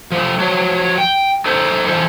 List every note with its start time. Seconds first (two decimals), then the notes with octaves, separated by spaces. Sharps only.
0.12 F3 A3
0.40 F3 F#4 C#5
0.98 G5
1.46 D#4 A4 C5
1.87 E3 F3 A4 C5